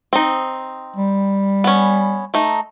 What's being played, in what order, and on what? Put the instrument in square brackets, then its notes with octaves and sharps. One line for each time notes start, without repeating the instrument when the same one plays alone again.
[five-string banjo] C4 D#4
[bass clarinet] G3
[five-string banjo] B3 C#4
A3 D#4